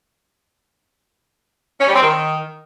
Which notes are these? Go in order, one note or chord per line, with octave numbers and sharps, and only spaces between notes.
C#4
G3
C4
D#3